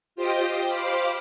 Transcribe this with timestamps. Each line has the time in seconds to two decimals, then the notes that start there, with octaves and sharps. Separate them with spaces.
0.16 F4 G4 C5 D#5 G5
0.65 C5 F5 B5 D6